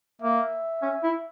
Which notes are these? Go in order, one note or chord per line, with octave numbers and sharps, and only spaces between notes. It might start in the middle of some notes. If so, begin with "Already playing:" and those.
A#3 E5
C#4
E4